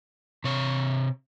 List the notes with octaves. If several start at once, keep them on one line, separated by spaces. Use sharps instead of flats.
C3 C#5